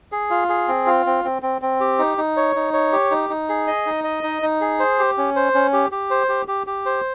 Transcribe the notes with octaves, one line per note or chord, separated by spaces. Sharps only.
G#4
F4
G#4
C4
F4
C4
C4
C4
C4
G4
D#4
D#4
C#5
D#4
C#5
G4
D#4
D#4
G#4
D#5
D#4
D#5
D#4
D#4
G#4
C5
G4
C#4
C5
C#4
G4
G4
C5
G4
G4
G4
C5